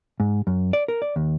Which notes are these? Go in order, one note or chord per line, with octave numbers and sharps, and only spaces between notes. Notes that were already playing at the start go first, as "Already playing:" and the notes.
G#2
F#2
D5
A#4
D5
D#2